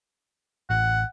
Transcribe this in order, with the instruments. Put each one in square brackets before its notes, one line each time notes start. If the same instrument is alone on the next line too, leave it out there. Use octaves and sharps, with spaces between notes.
[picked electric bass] A1 [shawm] F#5